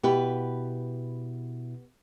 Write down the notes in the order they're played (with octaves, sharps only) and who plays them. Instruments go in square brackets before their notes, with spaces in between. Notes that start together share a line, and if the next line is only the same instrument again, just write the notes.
[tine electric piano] B2 E4 [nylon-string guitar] B3 G4 B4